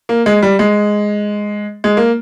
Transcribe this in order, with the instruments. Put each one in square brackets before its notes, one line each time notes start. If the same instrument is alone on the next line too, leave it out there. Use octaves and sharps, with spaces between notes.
[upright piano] A#3
G#3
G3
G#3
G#3
A#3